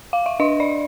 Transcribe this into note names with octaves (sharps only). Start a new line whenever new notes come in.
F5
E5
D4 D#5
D5